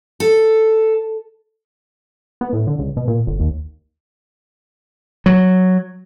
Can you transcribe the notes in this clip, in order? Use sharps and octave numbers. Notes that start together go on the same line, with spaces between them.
A4
B3
A2
D3
C#2
B2
A#2
G1
D#2
F#3